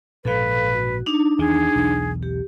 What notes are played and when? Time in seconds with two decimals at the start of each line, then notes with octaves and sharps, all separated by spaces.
0.25 A#1 G#2 B2 A4 B4 F5
0.74 F#4
1.06 D4 D#4
1.39 E2 D#3 G#4
1.75 B1 E2
2.23 G4